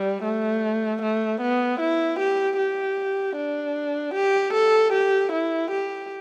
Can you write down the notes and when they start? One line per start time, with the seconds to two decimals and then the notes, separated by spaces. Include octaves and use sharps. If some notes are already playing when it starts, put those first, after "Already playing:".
Already playing: G3
0.24 A3
1.02 A3
1.41 B3
1.80 E4
2.20 G4
2.58 G4
3.36 D4
4.14 G4
4.53 A4
4.93 G4
5.32 E4
5.71 G4